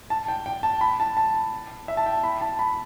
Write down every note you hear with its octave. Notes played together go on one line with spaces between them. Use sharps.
A5
G5
G5
A5
B5
A5
A5
E5
A5
G5
B5
A5
B5